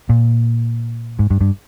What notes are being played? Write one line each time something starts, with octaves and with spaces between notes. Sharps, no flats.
A#2
G#2
G2
G2